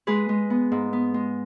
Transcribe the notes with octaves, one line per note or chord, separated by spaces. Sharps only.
G#3 G#4 B4
G#3
B3
G#2
B3
G#3